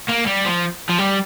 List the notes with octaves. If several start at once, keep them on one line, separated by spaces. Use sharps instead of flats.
A#3
G3
F3
F3
G3